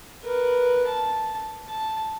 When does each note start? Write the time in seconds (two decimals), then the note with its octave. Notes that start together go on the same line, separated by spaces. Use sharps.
0.24 A#4 B4
0.87 A5
1.69 A5